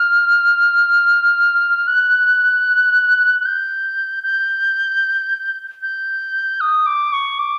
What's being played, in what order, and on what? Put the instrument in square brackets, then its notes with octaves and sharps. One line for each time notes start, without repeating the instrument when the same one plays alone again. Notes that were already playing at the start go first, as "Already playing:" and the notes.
Already playing: [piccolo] F6
F#6
F#6
G6
G6
G6
D#6
D6
C#6
D6